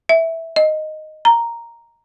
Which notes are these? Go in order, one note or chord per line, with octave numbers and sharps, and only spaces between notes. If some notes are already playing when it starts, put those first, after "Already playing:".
E5
D#5
A#5